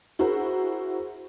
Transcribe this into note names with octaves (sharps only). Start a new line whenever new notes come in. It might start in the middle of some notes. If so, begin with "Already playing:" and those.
E4 F#4 G#4 A#4 C5